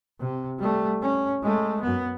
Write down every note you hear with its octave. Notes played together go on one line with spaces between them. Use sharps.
C3
G3 A3
C#4
G#3 A3
F#2 B3